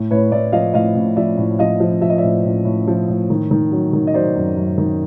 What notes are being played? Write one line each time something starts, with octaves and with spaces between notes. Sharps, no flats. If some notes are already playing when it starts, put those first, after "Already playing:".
Already playing: A2
A2 B4 C#5
A2 D5 E5
F3 D#5 F5
A2 D#5 F5
A2
F3 D5 E5
A2
F3 D#5 F5
F3
F3 E5
D#5
D5 E5
A2
A2
A2
F3
A2
D#3
D#3
F#3
D#3
D#5
F#3 C5 D5
F#2
F#2
D#3